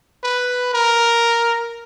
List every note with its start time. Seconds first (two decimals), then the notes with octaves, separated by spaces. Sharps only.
0.24 B4
0.74 A#4